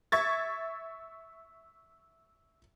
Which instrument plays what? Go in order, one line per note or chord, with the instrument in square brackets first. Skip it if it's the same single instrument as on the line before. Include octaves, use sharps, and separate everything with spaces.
[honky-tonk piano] E5 C#6 G#6 A6